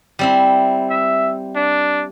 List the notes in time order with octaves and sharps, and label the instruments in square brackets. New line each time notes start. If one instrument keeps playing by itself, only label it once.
[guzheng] G3 C4 E4
[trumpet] E5
D4